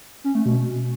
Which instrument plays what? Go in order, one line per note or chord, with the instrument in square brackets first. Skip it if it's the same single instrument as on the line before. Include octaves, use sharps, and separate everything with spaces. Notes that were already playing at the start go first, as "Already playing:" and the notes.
[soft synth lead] C#4
A3
B2